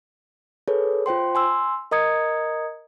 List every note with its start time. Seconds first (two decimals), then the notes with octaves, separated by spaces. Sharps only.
0.68 G#4 A4 B4 C#5
1.06 F4 C5 G5 C6
1.35 G#5 C6 E6
1.91 A#4 D#5 A#5 D#6 G#6 C#7